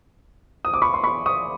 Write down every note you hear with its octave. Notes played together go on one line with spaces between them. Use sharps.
D#6
D6
B5 C#6
C6
B5 C#6
C#6 D#6